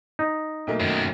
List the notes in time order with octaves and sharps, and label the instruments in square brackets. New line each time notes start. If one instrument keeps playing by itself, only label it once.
[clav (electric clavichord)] D#4
[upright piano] B1 A3 A#3
[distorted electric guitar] F#2 D#3